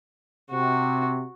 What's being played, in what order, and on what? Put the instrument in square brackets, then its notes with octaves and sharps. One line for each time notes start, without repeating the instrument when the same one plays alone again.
[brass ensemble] C3 [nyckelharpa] F#4